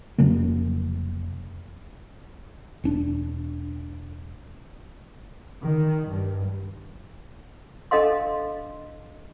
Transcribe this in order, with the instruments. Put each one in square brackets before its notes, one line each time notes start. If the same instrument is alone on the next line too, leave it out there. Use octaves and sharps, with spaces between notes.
[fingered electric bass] F1 C#3 F#3 A#3
[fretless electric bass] E1 C#4 D4
[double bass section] D#3
G2
[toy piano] D4 A4 D#5 F5 C6